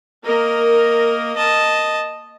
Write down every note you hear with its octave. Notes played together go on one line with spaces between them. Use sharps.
A#3 A#4 D#5
D#5 A5